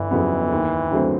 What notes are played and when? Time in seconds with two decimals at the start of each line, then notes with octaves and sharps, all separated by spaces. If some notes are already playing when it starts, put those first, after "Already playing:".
Already playing: G1 E3
0.11 F2 C#3 F#3 B3
0.52 D#2
0.91 D3 F#3 A3 C4